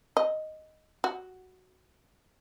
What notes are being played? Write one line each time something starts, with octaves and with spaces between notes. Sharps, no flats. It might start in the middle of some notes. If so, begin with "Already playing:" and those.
D#5
F#4